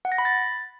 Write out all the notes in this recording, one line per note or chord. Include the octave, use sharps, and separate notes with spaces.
F#5
A#6
B5
A6